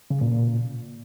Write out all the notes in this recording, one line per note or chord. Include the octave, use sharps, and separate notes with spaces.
C#3
A#2
A#2